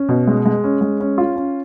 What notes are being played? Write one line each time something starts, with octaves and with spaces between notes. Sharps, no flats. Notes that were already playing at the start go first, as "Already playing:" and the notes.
Already playing: C#4
B2
G#3
G#3
C#4
G#3
C#4
F4
C#4